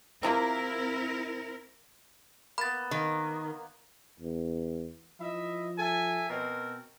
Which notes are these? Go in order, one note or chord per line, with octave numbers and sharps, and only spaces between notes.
C3 F3 A#3 C4 E4 A#4
A#3 B3 B5 A6
D#3
E2
F3 E4 D#5 E5
A4 E5 G#5
B2 C4 A#4